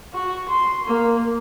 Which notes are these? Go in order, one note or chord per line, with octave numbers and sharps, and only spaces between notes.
F#4
C6
A#3